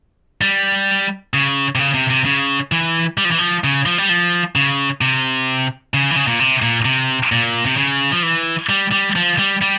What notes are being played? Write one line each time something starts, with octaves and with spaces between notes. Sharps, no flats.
G3
C#3
C3
C#3
C3
C3
C#3
E3
G3
F3
E3
F3
C#3
F3
G3
F3
C#3
C3
C#3
E3
C#3
A#2
C3
A#2
C3
A#2
C3
C#3
F3
E3
G3
G3
F3
G3
G3